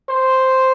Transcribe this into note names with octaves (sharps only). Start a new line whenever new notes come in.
C5